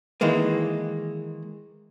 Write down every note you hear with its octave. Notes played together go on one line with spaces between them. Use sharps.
D#3 E3 G#3 A#3